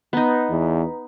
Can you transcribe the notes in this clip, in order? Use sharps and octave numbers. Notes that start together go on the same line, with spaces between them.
B3 D#4 B4 A#5
E2